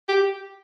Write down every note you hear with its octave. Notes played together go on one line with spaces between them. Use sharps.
G4